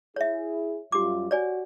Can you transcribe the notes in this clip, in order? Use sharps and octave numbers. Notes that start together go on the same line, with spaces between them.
E4 G#4 C#5 E5
F#2 G3 F4 G4 D6
F#4 C#5 D5 G#5